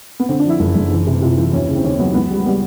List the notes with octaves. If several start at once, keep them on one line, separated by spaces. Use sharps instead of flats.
B3
D3 C4
D4
F3 E4
F#1
F#1
E3
C3
C3 F4
E3
D#2 C#4
C#3
C4
D#2 C#4
F#3 B3
C#2 B3
G3
G3 B3